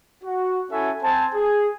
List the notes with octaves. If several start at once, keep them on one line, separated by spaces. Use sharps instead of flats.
F#4
C#4 E4 F#4 A4 E5 G#5
C4 C5 G#5 A5
G#4